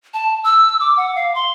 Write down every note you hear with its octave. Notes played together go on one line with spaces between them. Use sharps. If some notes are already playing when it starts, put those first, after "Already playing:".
A5
E6
D6
F#5
F5
C6